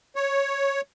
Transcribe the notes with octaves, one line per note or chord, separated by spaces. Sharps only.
C#5